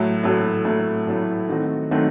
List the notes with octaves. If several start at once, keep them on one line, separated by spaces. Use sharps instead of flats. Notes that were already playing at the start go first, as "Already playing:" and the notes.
Already playing: A2 F#3 A3 E4
A2 F#3 A3 E4
A2 F#3 A3 E4
A2 F#3 A3 E4
D#3 F#3 A3 C4 F#4
D#3 F#3 A3 C4 F#4